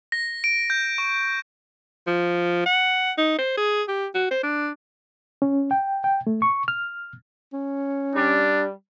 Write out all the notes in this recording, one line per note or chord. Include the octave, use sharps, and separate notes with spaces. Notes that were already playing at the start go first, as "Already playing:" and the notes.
A#6
D7
G6
C#6
F3
F#5
D#4
C5
G#4
G4
F#4
C5
D4
C#4
G5
G5
A3
C#6
F6
C#4
G3 D4